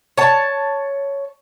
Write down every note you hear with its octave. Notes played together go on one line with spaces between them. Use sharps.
C#5 A5